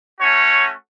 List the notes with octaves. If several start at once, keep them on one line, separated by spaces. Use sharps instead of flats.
A3 C#4 F#4 C#5